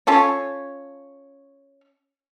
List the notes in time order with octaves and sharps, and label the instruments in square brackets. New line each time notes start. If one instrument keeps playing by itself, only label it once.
[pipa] C#4 F4 A4 C#5